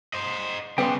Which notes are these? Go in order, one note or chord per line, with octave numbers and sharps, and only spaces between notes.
C5 D#5
C#3 G3 B3 G5 C6